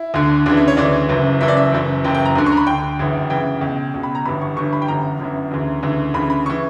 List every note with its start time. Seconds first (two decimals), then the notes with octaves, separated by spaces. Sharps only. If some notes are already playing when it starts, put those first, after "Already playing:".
Already playing: E4
0.14 D2 D3
0.46 D2 C#3 E3 D4
0.57 E4
0.68 C#5
0.77 D2 C#3 E3 D5
1.09 F#1 F#2 E3
1.41 F#1 F#2 E3 E5
1.48 D5
1.57 E5
1.72 F#1 F#2 E3
2.04 F#1 F#2 E3 G5
2.15 G5
2.25 A#5
2.36 D2 D3
2.46 C#6
2.52 A#5
2.57 B5
2.67 D2 D3 G5
2.99 G1 F#2 C#3 E3
3.30 G1 F#2 C#3 E3 G5
3.61 C#2 B2
3.94 C#2 B2
4.03 B5
4.15 A#5
4.25 G1 G2 E3 B5
4.42 C#6
4.56 G1 G2 E3 C#6
4.73 B5
4.82 G5
4.88 G1 F#2 E3 A#5
5.19 G1 F#2 E3
5.51 D2 C#3 E3
5.83 D2 C#3 E3
6.14 D2 C#3 E3 B5
6.30 B5
6.46 C#3 E3 C#6